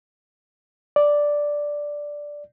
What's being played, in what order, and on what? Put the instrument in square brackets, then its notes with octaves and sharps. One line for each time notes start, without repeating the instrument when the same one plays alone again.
[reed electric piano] D5